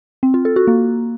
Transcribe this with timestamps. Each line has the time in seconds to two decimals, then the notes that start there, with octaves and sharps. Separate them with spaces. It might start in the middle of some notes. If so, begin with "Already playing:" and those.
0.23 C4
0.34 F4
0.45 A4
0.56 F#4
0.67 A#3